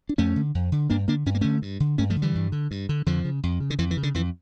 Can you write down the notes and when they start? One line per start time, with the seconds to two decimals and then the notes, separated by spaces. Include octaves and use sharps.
0.09 D4
0.18 F2 A3 C#4
0.36 D3
0.55 F2
0.72 D3
0.90 G2 A#3 D4
1.08 D3 A#3 D4
1.26 G2 C#4
1.35 A#3
1.41 D3 A3 C#4
1.62 G2
1.80 D3
1.98 G2 A3 C#4
2.10 F3 A3
2.16 D3
2.22 E3 G3
2.35 G2
2.52 D3
2.71 G2
2.89 D3
3.06 F2 D3 F3
3.24 C#3
3.43 F2
3.60 C#3
3.70 D3
3.79 F2 E3
3.91 E3
3.97 C#3
4.03 D3
4.14 F2 E3